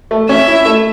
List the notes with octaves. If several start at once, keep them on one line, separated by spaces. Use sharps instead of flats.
A3
C#4 E5
E4
A3